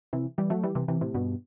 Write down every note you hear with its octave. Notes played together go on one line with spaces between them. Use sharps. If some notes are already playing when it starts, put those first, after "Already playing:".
C3 E3
E3 G3
F#3 A3
E3 G3
C3 E3
C3 E3
A2 C3
G2 B2